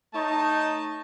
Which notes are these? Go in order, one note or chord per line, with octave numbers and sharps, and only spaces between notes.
A3 D#4 C#5 A5